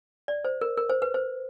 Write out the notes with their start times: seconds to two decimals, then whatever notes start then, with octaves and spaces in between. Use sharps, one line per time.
0.28 D5
0.45 C5
0.61 A#4
0.77 A#4
0.90 C5
1.02 B4
1.14 C5